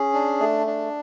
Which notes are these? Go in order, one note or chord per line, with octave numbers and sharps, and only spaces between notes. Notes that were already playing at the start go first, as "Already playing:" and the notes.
Already playing: C#4 G#4
D4
A3
D4